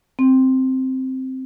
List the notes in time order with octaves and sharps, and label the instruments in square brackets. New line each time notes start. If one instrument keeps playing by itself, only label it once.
[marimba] C4